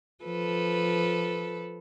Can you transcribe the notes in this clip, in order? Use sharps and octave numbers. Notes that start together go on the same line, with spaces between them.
F3 A4 B4